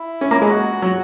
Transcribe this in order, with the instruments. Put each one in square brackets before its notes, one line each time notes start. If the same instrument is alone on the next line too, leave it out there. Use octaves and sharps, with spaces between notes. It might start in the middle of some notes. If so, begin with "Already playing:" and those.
Already playing: [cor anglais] E4
[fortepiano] C#4
A#3
[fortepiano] G#3 [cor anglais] E4
[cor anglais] F#4
[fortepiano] F#3